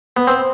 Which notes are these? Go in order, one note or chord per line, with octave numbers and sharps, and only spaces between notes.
B3
C4